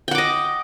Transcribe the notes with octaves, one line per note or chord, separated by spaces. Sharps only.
D#5 F#5 G5 D6